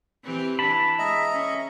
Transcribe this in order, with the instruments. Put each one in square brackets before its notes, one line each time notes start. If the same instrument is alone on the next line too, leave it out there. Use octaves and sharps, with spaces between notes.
[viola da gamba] E3 C4 G4
[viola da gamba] E3 D4 E4 [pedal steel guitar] A5 B5
[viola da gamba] G#3 [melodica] D#5 E5 A#5
[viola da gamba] C#4